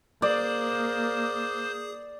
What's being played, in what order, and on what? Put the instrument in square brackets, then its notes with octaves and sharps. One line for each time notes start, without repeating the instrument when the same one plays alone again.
[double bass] A#3 [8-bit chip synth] G#4 D#6 [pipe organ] C5 [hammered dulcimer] D5